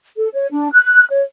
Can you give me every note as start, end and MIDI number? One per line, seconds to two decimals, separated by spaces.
0.17 0.29 69
0.33 0.47 73
0.51 0.69 62
0.73 1.05 90
1.10 1.23 73